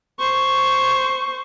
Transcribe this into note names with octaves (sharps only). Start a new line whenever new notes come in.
C5 C#6